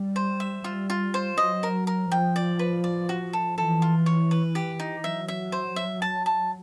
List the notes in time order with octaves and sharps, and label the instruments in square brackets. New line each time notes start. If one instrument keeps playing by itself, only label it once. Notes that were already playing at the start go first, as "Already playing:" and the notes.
Already playing: [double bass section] G3
[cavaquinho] C5
E5
[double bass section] G3 [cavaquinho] F4
[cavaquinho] F4
C5
[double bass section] F#3 [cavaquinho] D#5
[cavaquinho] A#4
A#4
[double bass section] F3 [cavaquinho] G5
[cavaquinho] D5
B4
D5
F#4
A4
[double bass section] E3 [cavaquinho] A4
[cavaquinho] F4
C#5
B4
G4
D#4
[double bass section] F#3 [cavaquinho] E5
[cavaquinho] E5
C5
E5
A5
A5